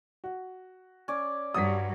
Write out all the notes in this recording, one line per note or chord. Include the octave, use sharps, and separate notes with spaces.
F#4
C#4 D5
G2 F#3 D#6 B6